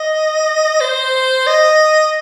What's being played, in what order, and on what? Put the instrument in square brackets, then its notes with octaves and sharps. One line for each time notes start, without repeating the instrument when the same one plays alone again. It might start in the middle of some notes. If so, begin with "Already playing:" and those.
Already playing: [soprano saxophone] D#5
C5
D#5